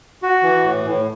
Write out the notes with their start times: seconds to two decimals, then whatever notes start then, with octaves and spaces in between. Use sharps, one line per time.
0.23 F#4
0.43 E3
0.64 A2
0.85 A2